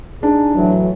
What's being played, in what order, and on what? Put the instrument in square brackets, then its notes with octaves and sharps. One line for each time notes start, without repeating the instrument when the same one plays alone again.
[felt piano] D4 [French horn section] D#4 G#4
[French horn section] A2 E3 F#3